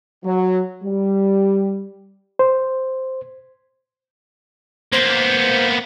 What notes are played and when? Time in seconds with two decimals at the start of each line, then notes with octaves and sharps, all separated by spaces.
0.24 F#3
0.83 G3
2.39 C5
4.92 A#3 B3 C5